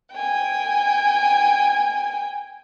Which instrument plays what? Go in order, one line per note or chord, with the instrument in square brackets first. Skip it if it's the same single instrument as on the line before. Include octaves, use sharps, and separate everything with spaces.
[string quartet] G5 G#5